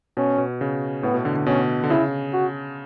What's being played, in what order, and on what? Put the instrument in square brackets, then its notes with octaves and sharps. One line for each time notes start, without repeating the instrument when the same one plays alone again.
[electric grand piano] B2 [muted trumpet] C#4
[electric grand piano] B2
C#3
[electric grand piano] A2 [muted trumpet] B3
[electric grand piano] B2
D3
D3
[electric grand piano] B2 [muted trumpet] C#4
[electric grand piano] D3
[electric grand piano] C#3 [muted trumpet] E4
[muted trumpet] F#4